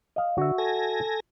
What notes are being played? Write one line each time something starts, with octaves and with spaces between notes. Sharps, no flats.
D#5 F5
D3 F#4 E5
A4 G#5 A#6